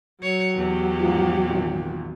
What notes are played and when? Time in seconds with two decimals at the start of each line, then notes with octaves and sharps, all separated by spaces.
0.22 F#3 C#5
0.56 E2 G4
1.00 G#2 F3
1.45 G#1 A#2